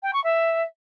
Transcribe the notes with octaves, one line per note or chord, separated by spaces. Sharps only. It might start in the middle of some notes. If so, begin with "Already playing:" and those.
G5
C#6
E5